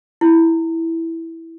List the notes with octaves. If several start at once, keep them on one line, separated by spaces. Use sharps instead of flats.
E4